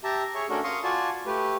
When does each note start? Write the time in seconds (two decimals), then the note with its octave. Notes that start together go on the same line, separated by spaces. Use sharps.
0.04 G4 E5 A5 A#5
0.35 G#4 C#5 E5 C#6
0.50 A3 C#4 D4 F#4 A4 A#4
0.64 F5 C6 C#6 D#6
0.84 F4 F#4 D5 G#5 A5
1.26 A3 G4 B4